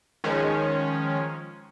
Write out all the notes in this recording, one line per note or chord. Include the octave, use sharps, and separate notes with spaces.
D#3 F3 G#3 C#4